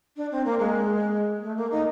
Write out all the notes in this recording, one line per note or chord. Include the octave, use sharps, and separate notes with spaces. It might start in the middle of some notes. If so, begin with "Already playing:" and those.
D4
C4
A#3
G#3
A3
A#3
D#4